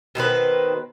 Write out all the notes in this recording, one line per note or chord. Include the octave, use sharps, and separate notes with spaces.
B2 D#3 C4 B4